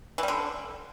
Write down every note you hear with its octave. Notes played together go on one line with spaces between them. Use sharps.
E3
G3
D3